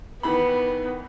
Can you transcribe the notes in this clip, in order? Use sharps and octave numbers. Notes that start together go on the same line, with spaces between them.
D#3 E3 B3 B5